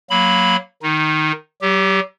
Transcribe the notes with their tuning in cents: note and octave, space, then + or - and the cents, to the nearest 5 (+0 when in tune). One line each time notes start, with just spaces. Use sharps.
F#3 +0 A#3 +0 B5 +0
D#3 -10 D#4 +0
F#3 +45 G4 +0